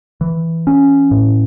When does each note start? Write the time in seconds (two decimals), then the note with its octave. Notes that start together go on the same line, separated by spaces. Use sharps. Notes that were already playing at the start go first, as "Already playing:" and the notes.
0.21 E3
0.67 C#4
1.11 A2